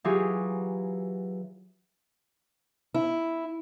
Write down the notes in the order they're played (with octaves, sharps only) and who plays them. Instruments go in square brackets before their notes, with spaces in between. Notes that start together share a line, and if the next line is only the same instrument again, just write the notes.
[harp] E3 F#3 F4 G4 G#4
[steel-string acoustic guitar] E4